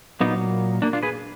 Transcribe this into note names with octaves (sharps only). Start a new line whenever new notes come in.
A#2 F#3 A#3 B3 D#4
A#3 D4
D4 F4
G#4 B4